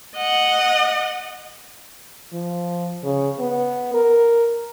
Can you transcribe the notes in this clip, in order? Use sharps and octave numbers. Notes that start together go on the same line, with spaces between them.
D#5 F#5
F3
C#3
B3
A#4